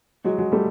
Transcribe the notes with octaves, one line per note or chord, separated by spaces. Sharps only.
F#3 G#3
F#3 G#3
G3 A3